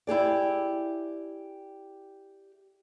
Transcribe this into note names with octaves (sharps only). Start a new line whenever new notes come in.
E4 G4 G#4 D5